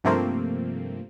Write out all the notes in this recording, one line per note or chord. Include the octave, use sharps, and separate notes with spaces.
G2 C3 F3 A3 A#3 C4